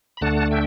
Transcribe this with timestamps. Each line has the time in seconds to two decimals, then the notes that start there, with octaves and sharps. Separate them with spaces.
0.17 B5
0.21 D2 D3 A3 D4 F#5 A5
0.51 E5 G5